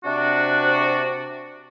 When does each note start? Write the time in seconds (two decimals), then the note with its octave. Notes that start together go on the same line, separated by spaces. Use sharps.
0.04 C3 D4 F#4